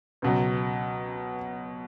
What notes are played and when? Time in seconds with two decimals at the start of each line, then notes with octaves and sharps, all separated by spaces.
0.22 C#2 B2 F#3